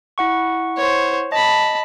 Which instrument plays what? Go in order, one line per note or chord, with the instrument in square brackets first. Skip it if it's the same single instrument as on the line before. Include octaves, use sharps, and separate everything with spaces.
[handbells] E4 F#5 C#6
[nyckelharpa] C5 C#5
[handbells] D#5 [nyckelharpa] A5 B5